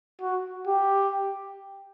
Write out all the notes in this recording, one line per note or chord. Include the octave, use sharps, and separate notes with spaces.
F#4
G4